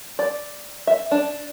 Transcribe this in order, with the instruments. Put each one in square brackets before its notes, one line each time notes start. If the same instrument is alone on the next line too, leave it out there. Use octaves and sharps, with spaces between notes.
[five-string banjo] D5
E5
D4